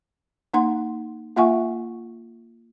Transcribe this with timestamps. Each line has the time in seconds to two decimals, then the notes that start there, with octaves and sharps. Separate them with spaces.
0.54 A#3 D#4 F#5 C6
1.36 A#3 F4 E5 F#5 G#5 C#6